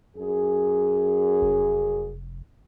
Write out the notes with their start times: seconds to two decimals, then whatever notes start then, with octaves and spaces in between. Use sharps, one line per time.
0.17 F#2 G#4
1.42 F1